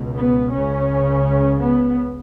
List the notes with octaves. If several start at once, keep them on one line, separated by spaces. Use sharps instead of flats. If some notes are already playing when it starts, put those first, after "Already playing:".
Already playing: C#2 B2
B3
C#2 C#3 C#4
B3